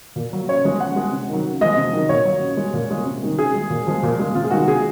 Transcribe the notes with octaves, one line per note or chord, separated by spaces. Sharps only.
A#2
F#3
C#3 C#5
F3 G#3
C#3 F#5
G#3
C3
D#3 F#3
C#3
F3 G#3 D#5
C3
D#3 F#3
A#2 C#5
F#3
C#3
G#3
A#2
G#3
C3
D#3 G#3
C#3 G#4
G#3
A#2
F3 G#3
A#2
G#3
C3 F4
G#4
D#3 G#3 F#4
C3 G#4